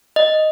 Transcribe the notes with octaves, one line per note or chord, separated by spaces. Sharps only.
D#5